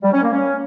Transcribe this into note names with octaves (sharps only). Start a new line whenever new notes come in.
G3
C#4
A#3
C#4